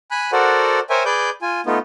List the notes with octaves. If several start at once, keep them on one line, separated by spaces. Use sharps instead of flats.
G#5 B5 F#6
F#4 A4 A#4 C5 D5 F#5
A#4 C5 C#5 E5 G5 G#5
G#4 B4 D5 D6 G6
F4 G#5
A3 B3 D#4 F4